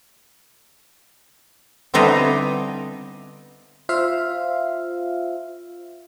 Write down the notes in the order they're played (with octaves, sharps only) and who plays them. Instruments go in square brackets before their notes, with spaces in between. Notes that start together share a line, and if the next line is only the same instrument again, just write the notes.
[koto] D3 G3 B3 C4 D#4 E4
[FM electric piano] F4 C5 E5 F5